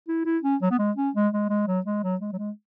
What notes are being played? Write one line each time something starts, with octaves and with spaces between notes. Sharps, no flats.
E4
E4
C#4
F#3
B3
G#3
C#4
G#3
G#3
G#3
F#3
G#3
F#3
G#3
F#3
G#3